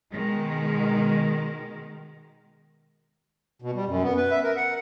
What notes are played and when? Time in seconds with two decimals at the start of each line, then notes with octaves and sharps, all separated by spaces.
0.11 B2 D#3 G#3
3.62 B2
3.75 G3
3.87 F#2
4.02 B3
4.17 B4
4.31 E5
4.44 A#4
4.57 F#5